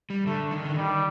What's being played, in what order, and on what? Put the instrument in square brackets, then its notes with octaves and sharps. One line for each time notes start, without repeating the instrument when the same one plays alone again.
[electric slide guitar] G3
[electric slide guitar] D3 [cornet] A3
[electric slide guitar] D#3
D3
[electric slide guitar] D#3 [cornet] G3